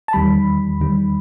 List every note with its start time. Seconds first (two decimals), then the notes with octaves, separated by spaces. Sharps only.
0.08 A5
0.13 E2 D#3 G3 B5
0.80 E2 D#3 G3